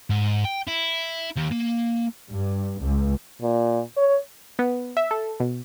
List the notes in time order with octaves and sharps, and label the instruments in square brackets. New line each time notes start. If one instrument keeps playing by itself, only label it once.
[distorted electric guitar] G#2
G5
E4
D#2
A#3
[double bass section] G2
C#2
[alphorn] A#2
C#5
[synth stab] B3
E5
A4
B2